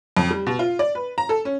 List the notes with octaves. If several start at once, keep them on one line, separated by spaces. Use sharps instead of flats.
F2
G3
B2
F4
D5
B4
A#5
A4
C#4